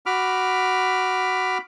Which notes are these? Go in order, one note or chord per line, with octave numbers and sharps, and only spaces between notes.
F#4 B5 D6 F6